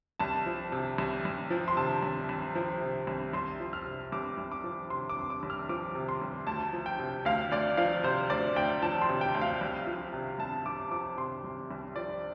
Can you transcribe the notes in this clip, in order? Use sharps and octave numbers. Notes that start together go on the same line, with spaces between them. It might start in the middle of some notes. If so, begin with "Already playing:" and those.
C2 A5
F3
C3
C2
C2
F3
C6
C3 A5
C2
C2
F3
C3
C2
C2 C6
F3
F6
C3
C2 D6
C2
D6
F3
C3 C6
D6
C2
D6
C2
F6
F3 D6
C3
C6
C2
D2 A5
F3
G5
C3
D2 F5
D2 D5
F3 F5
C3 C5
D2 D5
D2 G5
F3 A5
C6
C3
G5
D2
F5
C2
F3
C3
C2 A5
C2 D6
F3 D6
C3 C6
C2
C2
F3 D5